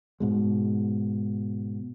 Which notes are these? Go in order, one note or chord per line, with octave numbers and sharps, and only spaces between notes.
G#2 B2 G#3